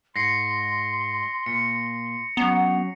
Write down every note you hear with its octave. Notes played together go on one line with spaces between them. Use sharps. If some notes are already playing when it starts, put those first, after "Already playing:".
G#2 C6 A#6 C7 C#7
A#2 C#7
F#3 B3 C#4 A#5